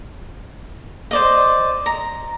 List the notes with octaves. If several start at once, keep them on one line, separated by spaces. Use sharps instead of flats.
C5 D5 D#5
A#5